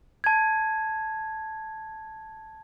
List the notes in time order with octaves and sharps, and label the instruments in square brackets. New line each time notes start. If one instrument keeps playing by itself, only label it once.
[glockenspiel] A5 G#6